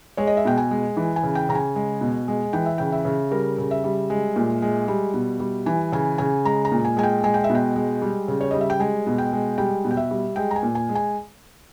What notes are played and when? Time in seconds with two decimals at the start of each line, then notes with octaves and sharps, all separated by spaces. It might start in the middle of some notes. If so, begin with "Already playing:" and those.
0.17 G#3 C#5
0.27 D#5
0.37 E5
0.45 B2 G5
0.58 G#5
0.71 G#3
0.97 E3
1.16 G#5
1.23 C#3
1.35 G5
1.49 C#3 A#5
1.55 G#5
1.76 G#3
2.01 B2
2.28 G#3
2.53 E3 G5
2.66 E5
2.78 C#3 G5
2.92 E5
3.05 C#3
3.31 G3 A#4
3.58 C#3
3.71 E5
3.84 G3
4.10 G#3
4.36 A#2
4.62 G#3
4.88 G3
5.14 B2
5.40 G3
5.66 E3 G#5
5.92 C#3 G#5
6.18 C#3 G#5
6.45 G#3 A#5
6.65 A#5
6.71 A#2
6.85 G#5
6.97 G#3 G#5
7.03 G5
7.24 G#3 G#5
7.34 G5
7.44 E5
7.50 B2
7.55 G5
7.76 G#3
8.02 G3
8.28 C#3
8.41 C#5
8.51 G3 D#5
8.61 E5
8.70 G5
8.80 G#3 G#5
9.07 B2
9.18 G5
9.33 G#3
9.58 G3 G5
9.84 B2
9.91 G5
9.97 E5
10.11 G3
10.36 G#3 G5
10.51 A#5
10.56 G#5
10.63 A#2
10.75 G#5
10.89 G#3
10.95 G#5